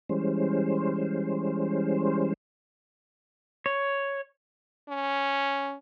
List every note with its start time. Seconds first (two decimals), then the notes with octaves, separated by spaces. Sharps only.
0.09 E3 G3 G#3 C#4 C5
3.66 C#5
4.89 C#4